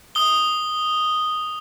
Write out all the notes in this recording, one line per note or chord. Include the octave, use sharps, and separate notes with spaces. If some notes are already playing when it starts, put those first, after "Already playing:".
D#6 G7